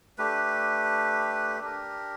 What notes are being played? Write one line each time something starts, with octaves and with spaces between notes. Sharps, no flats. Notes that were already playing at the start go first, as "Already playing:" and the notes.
A3 D4 G4 B4
D4 G4 A#4